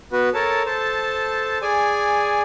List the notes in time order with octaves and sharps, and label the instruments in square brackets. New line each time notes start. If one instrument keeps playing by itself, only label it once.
[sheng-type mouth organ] B3 F#4 B4
A4 A#4 C#5 A5
A4 C5 A5
G#4 D5 G#5